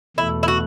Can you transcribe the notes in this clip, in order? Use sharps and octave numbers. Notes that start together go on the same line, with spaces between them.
E2 B2 A3 E4
E4
F#4